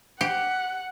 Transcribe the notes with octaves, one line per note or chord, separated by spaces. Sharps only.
G4 F#5